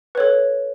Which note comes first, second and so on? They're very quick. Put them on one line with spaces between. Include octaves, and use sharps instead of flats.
B4 C#5 A4